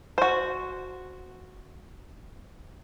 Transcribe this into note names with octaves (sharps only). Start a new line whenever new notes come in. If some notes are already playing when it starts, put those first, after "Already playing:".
F#4 C5